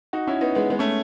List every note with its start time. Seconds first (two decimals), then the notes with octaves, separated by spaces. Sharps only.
0.13 D#4 F#4
0.27 C#4 E4
0.41 B3 D#4
0.55 G#3 B3
0.70 G#3 B3
0.79 A3 C#4